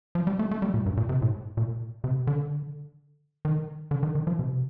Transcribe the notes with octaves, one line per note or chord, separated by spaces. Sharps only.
F3
G3
A3
A3
G3
A#2
G2
A#2
C3
A2
A#2
C3
D3
D#3
D3
D#3
D#3
F3
C3